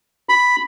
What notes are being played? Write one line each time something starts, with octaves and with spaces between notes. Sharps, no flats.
B5